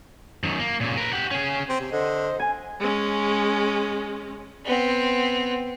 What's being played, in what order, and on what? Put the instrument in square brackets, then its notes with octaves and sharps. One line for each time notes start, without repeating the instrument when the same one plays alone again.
[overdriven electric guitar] F#2 D#3
A#3
A#2 C#3
A#4 B4
G4 F#5
C#4 G#4
[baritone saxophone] C4
C3
[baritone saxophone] D3 [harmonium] C5 D#5
[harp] G#5
[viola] G#3 C#4
[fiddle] B3 C4